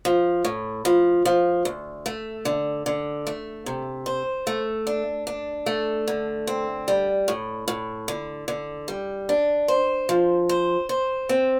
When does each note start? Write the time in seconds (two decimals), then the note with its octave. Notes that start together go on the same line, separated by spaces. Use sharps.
0.05 F3
0.45 A2
0.85 F3
1.25 F3
1.65 D2
2.06 A3
2.45 D3
2.86 D3
3.27 A3
3.66 C3
4.06 C5
4.47 A3
4.87 D4
5.27 D4
5.66 A3
6.08 D3
6.47 C4
6.88 G3
7.28 A2
7.68 A2
8.08 D3
8.48 D3
8.88 G3
9.29 D4
9.68 C5
10.09 F3
10.49 C5
10.89 C5
11.29 C4